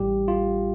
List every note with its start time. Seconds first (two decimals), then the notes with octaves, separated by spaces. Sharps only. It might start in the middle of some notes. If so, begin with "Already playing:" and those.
Already playing: A1 A2 G3 G4
0.28 F4